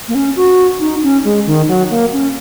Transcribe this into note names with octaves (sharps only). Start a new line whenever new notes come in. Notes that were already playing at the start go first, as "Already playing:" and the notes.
A#3
C#4
F#4
D#4
C#4
G#3
D#3
F#3
A#3
C#4